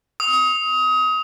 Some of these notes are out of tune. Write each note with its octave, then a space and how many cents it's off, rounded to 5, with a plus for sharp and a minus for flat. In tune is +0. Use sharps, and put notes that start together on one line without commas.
D#6 +25